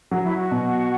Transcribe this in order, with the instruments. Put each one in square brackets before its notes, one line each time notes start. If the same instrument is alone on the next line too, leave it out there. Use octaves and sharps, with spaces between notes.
[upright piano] F#3 [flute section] F#4
[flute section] E4
F#4
[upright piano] B2